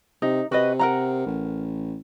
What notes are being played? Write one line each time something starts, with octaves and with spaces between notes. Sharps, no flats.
C3 D#4
C3 F#4 B4 D#5
A#4 F#5 A#5
A1